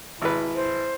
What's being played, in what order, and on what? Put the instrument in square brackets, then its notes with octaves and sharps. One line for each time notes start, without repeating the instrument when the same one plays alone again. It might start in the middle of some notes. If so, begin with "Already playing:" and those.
[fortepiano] G#1 B4 [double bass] E4
[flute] C5